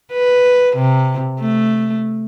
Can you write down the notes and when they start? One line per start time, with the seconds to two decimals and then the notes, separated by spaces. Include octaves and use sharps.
0.13 B4
0.76 C3
1.40 A3